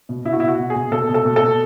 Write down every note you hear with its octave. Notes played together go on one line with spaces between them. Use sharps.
B2
B2 E4
F#4
B2 E4
F#4
B2
G#4
B2
B2 A4
B2
A4
B2
A4
B2